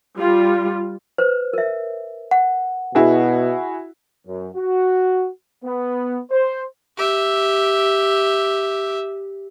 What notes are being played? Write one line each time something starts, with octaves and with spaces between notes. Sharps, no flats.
G3 F4
B4 C5
A#4 E5
F#5
B2 E4 F#4 G#4
F#2
F#4
B3
C5
G4 E5